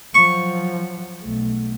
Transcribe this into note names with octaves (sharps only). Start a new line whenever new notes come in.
F3 F#3 C#6
B1 A3